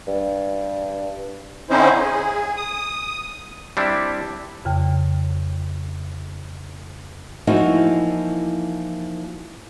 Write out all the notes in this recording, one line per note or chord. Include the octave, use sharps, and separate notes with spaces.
G2
D3 C4 C#4 D#4 E4 C5
G#4
D#6
G3 C4 D4 E4
F2 C#3 G5
E3 F3 A#3 D#4 E4 F#4